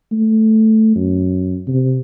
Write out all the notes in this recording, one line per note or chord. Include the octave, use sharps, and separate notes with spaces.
A3
F#2
C3